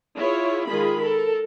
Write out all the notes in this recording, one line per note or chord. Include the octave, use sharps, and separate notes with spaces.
E4 F4 G#4 C#5
D#3 G#3 F4 G#4 B5
A4 A#4